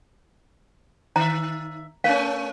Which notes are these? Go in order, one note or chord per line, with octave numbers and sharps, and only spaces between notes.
D#3 E5 A#5
A3 C#4 F5